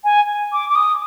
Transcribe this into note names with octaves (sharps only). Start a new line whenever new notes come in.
G#5
D6
D6
D#6